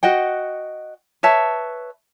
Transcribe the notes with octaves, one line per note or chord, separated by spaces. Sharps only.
F#4 D#5 F#5 G5
B4 C#5 E5 A5